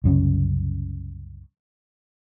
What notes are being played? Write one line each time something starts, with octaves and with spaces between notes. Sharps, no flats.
C2 F#2 C#3